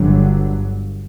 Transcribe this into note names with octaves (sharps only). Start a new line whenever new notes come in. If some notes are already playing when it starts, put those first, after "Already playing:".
Already playing: G1 G2 D3 F#3